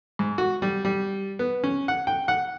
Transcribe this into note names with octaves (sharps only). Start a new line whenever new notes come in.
G#2
F#4
G3
G3
B3
C#4
F#5
G5
F#5